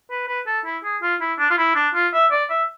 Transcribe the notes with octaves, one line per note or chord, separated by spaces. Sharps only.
B4
B4
A4
E4
G#4
F4
E4
D4
F4
E4
D4
F4
E5
D5
E5